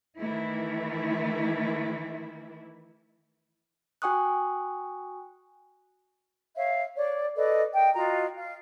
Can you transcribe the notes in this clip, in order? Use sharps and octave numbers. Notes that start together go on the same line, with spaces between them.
D#3 E3 A3 E4
F#4 G5 G#5 C#6 D#6 F#6
C#5 E5 F5
C#5 D5
A4 B4 D5 D#5
A#4 D#5 G5
F4 F#4 D#5 A#5
F5